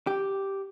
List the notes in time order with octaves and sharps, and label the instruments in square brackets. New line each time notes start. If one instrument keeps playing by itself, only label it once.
[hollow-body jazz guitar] G4